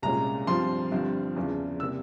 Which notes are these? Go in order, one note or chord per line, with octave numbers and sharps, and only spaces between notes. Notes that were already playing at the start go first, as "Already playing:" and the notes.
C2 A#2 G#3 C#4 A#5
G2 F3 C4 C6
G1 G2 F3 C4
E2 C#3 F3
C3 G3 A#3 E6